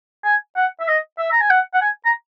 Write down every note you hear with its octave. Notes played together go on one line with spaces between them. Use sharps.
G#5
F#5
E5
D#5
E5
A#5
G#5
F#5
F#5
G#5
A#5